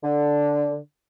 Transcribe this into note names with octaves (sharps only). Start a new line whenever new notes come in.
D3